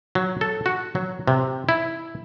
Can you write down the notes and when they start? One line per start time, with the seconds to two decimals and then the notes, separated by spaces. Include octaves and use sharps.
0.15 F#3
0.41 A4
0.66 F#4
0.95 F#3
1.28 C3
1.69 E4